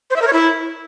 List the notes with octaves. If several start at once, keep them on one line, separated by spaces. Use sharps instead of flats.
C5
E5
A#4
C#5
E4